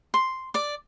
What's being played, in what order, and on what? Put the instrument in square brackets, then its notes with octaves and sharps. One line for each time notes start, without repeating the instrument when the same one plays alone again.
[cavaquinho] C6
D5 D6